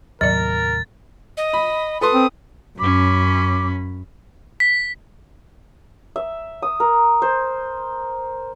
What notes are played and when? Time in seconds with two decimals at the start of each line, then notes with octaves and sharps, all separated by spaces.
0.21 D#2 A2 C3 F#3 A#4 D5 A6
1.37 D#5
1.53 B5
2.01 A4 B4 C6 D#6
2.13 C4
2.79 F#2 C#4 B5 D6
4.60 B6
6.16 E5
6.62 D#6
6.80 A#4
7.22 C5